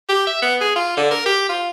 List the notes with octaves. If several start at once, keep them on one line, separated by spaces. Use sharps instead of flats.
G4
E5
B3
G#4
F4
D3
A#4
G4
F4